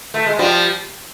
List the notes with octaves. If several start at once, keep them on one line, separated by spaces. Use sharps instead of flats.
A3
G#3
F3 G3